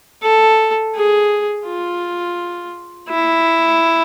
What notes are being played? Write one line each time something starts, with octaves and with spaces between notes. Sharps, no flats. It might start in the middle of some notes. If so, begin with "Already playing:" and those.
A4
G#4
F4
E4